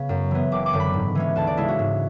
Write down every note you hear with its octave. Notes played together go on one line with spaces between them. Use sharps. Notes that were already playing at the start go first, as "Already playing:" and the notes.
Already playing: C#3 B3
F#2
E3 B3
F#1 D6
D6
F#2 D3
B5
G#2
E3 G#3 C#4
D2 A5
D5
C#3 G#3 E4
F#4
G#2